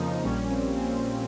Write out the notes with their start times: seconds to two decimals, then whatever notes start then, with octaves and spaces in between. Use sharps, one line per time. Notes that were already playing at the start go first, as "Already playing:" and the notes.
Already playing: F2 C#3 F3 A#3 D#4
0.24 A#1 A#2 G3 A#3 C#4
0.50 C4
0.77 C4
1.03 C#4